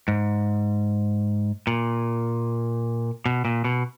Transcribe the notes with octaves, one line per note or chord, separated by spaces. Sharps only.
G#2
A#2
B2
A#2
B2